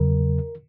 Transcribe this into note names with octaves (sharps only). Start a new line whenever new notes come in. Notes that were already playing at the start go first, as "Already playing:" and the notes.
Already playing: E2 C#3 F#3 A#4